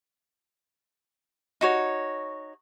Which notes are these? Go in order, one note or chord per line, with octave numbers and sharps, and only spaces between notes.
D#4 F#4 C#5